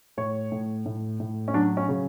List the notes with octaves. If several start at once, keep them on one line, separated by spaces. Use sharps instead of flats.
A2 C#5
A2
A2
A2
C#4
F#3 D4
C#4
C#3